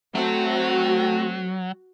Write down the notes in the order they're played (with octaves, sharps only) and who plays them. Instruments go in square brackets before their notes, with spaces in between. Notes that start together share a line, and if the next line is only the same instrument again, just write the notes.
[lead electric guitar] F#3 [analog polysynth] A3 C4 [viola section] F#4